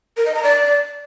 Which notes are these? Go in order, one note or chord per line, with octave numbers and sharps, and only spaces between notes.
A#4
D#5
A#5
D5